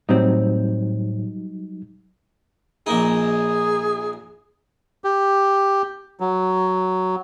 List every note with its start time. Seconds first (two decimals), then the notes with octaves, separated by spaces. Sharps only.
0.09 A2 F#3 G3 C4 D#4
2.87 A#1 A#3 D#4 G#4
5.04 G4
6.20 F#3